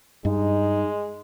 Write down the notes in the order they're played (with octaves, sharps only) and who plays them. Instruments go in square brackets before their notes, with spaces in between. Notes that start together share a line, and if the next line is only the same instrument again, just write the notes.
[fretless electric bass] G2 [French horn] G#3 [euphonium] D#4